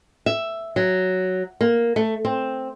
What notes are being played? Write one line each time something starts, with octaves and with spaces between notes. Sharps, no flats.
E5
F#3
A#3
A3
C4